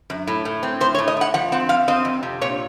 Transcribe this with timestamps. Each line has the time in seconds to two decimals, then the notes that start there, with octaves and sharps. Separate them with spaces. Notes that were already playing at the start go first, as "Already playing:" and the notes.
0.10 F#2
0.27 A2
0.45 A2
0.63 C4
0.80 A2 C5
0.95 C#5
0.98 A2
1.08 D#5
1.17 A2 F#5
1.34 F3 F#5
1.52 C4 F#5
1.69 F2 F5
1.88 C4 D#5
2.05 F2
2.23 C3
2.41 A#2 C#5